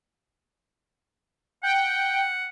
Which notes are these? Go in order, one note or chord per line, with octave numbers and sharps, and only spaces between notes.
F#5 G5